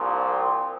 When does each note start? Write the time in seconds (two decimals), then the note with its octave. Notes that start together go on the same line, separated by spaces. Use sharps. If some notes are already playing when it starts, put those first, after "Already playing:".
Already playing: C2 A#2 F3
0.17 C4